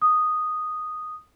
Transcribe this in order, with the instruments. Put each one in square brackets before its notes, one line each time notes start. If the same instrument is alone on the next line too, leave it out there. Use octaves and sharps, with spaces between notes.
[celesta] D#6